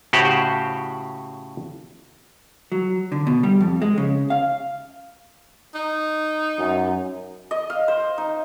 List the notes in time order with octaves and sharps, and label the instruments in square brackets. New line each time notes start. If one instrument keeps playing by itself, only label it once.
[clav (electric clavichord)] A2 C#3 F#4 G4 C5 F#5
[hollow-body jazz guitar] F#3
D3
B2
G3
F2
G#3
C#3
F5
[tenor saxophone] D#4
[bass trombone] F#2
[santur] D#5
F5
C5
D#4